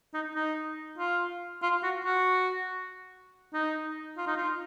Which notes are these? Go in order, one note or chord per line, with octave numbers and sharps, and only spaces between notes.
D#4
D#4
F4
F4
F#4
F#4
D#4
F4
D#4
F4